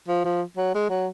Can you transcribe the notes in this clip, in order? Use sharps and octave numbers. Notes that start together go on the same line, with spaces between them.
F3
F3
F#3
G#3
F#3